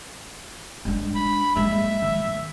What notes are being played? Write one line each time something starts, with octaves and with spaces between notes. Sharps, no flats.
G#3 D4
B5
G#3 A#3 E5
D#3